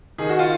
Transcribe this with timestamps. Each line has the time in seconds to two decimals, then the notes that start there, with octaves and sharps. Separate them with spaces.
0.18 D#3 G#4
0.29 F#4
0.39 F4